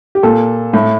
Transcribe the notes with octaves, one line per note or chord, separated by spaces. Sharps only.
G4
A#2 A4
A2